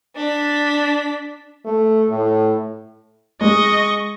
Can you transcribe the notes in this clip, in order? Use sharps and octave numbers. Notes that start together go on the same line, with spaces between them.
D4 B6
A3
A2
G#3 D#5 C#6